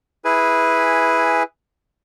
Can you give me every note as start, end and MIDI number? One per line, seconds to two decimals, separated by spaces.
0.25 1.43 64
0.25 1.43 68
0.25 1.43 71
0.25 1.43 80